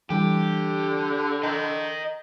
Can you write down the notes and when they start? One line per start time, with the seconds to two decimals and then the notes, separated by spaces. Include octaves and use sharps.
0.10 D3 E3 G3 G4
1.43 D#5 G5 A#5 G6